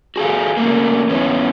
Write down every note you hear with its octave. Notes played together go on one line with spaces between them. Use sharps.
F#4 G#4 A4 F5
C#3 A3 A#3
E2 B3 C#4 E4